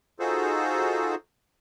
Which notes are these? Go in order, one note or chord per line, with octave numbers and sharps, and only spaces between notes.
D#4 F4 F#4 G#4 A4 C5